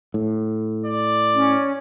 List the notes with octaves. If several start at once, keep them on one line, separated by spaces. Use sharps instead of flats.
A2
D5
C#4